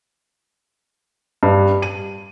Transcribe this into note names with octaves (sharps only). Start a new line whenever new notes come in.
G2
D#7